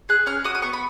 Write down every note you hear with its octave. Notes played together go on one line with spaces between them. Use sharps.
G#4 F#6
C#4 F6
F#4 D#6
D#6
B3 C#6
B5